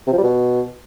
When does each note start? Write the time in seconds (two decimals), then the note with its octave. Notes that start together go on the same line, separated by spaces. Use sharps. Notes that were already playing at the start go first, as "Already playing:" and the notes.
0.07 C3
0.13 F3
0.18 G3
0.23 B2